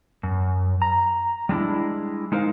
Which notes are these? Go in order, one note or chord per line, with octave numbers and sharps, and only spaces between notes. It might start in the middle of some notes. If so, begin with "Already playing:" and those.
F#2
A#5
G3 G#3 D4 E4
G#3 D#4 A#4 C5 E5 F5